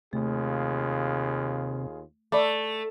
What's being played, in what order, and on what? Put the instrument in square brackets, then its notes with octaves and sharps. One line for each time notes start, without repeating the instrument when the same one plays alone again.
[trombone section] D#2 F4 G#4 [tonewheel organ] C3 [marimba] A3
[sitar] A3 [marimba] D5 B5 D6